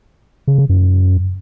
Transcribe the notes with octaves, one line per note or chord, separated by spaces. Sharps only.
C#3
C#3
F#2